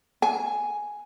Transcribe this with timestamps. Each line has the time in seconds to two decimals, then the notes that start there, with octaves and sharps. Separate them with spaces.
0.22 G#5